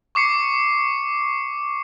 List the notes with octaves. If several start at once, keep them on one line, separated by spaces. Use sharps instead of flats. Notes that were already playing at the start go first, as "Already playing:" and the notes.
C#6 D6 C7 C#7